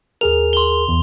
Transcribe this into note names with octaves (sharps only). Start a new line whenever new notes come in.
D#2 G#4 A#4 F7
C6 G7
E2